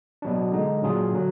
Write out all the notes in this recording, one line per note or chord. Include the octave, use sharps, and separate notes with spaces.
B2 F#3 D4
D3 G#3 D#4
A#2 F#3 D4 F4 G#4
D3 F#3